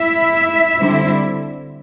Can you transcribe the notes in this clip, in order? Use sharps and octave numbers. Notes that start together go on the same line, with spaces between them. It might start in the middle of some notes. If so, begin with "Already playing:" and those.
Already playing: E4 E5
D3 G3 C4 E4